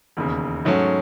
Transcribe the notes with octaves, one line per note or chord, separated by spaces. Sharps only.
E1 D#2 C#3
G#2 F#3 A3 C#4